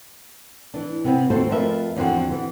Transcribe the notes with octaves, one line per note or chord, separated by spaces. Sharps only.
E3 D4
C3 B3 C4
D#2 C4 F4 F#4 A4 C5
F2 A3 F4 A#4 B4 E5
E2 D3 F3 C4 F#4
E3